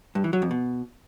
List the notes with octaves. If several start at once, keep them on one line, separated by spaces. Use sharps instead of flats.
G2
E3
F#3
F2
B2